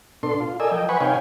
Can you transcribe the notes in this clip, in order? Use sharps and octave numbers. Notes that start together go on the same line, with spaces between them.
B2 D4 A4 C6
F4
A4 A#4 D5 D#5 G#5 E6
F3 D#5 G5
B4 C5 F#5 G#5 B5 C#6
C3 D#4 C#5 F5 G5 G#5